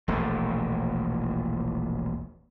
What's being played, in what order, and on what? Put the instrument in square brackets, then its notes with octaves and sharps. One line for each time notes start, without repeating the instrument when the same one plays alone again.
[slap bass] E1 A#1 A#2 A3